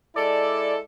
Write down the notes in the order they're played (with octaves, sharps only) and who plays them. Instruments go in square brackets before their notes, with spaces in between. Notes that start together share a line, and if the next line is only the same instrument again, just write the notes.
[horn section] G#3 E4 A4 [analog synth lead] D5